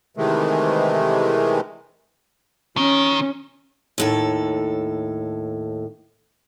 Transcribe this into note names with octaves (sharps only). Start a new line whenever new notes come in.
C3 D#3 E3 G#3 A3
D#3 C#4
D#2 A2 A4